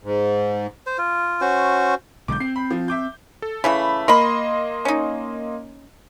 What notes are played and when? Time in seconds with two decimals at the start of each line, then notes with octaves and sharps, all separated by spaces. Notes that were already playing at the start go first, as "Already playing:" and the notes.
0.04 G#2
0.87 C5
0.98 F4
1.41 C#4 F#4 C5
2.28 B1 D3 G#3 D6 G6
2.40 C4 C7
2.56 B5
2.71 F3
2.88 E5 D6 G6
3.42 A4
3.64 C#3 E3 A3 B5
4.08 A#3 A#4 D#5 B5 C6
4.85 C#4 D#4